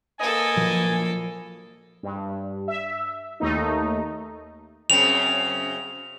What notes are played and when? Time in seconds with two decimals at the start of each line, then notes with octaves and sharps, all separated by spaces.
0.19 A#3 A4 B4 D#5 G#5
0.56 A#2 F3 F#3
2.03 G2
2.68 E5
3.40 D#2 A3 D#4
4.90 F#2 C#3 C4 F7